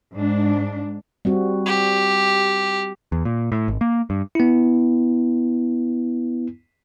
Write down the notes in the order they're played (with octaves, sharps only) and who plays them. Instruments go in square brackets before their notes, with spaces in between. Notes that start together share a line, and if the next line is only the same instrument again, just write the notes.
[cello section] G#2 D4
[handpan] G3 C4 F#4
[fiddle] G4
[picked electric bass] E2
A#2
A2
G#1
A#3
G2
[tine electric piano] B3 E4